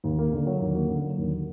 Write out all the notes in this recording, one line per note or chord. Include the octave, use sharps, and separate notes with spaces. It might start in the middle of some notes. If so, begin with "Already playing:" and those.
D#2
A#3
D3
F#3
D#2
A#3
D3
F#3
D#2